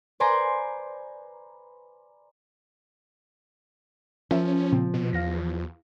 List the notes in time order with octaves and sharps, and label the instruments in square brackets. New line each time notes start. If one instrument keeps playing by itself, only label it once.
[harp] B4 C5 D5 G#5 A#5 C6
[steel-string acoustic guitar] F3 [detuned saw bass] C#4 [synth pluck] A#4 E5
[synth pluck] A#2 C#3 C4
[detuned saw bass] B2
[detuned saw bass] E2 [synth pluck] F5 A#6